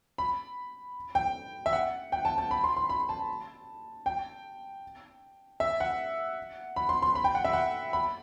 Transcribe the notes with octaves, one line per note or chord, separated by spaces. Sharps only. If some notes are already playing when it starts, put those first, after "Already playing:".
B5
G5
E5
F#5
G5
A5
A5
B5
C6
C6
B5
A5
G5
E5
F#5
B5
C6
C6
B5
G5
F#5
E5
F#5
B5